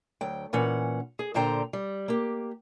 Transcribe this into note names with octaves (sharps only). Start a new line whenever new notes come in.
D2 F#3 G5
A#2 E3 C#4 F#5
G#4
A#2 D3 C5 G5 A#5
G3
A#3 G4